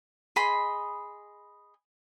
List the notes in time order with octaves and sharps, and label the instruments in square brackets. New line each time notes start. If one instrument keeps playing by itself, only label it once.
[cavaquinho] G#4 D#5 B5 C6